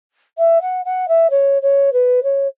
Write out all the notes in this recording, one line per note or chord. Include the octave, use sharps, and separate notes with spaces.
E5
F#5
F#5
E5
C#5
C#5
B4
C#5